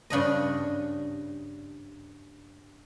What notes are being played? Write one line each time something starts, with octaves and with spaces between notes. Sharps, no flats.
G2 C#3 D4 D#5